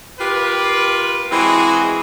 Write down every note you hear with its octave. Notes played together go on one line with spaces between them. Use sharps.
F4 G4 A#4 B4
E3 G#3 C4 F#4 G#4